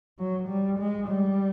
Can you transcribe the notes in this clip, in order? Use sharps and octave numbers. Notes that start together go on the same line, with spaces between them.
F#3
G3
G#3
G3